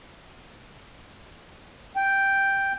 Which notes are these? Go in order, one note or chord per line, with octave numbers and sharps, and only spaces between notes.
G5